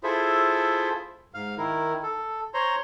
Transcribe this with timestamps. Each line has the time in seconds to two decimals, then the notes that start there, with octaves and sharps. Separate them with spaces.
0.03 E4 F4 G#4 A4 C5 E5
1.34 G#2 F5 F6
1.58 D#3 E4 A#4
2.03 A4
2.54 C5 C#5 A#5 C6